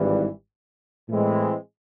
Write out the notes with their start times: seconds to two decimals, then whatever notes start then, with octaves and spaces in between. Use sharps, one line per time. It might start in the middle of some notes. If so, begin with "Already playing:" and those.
Already playing: G#1 G2 E3 G3
1.09 A2 E3 G#3 C4